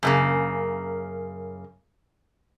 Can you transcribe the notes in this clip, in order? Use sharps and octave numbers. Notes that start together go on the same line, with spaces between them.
F#2 C#3 A#3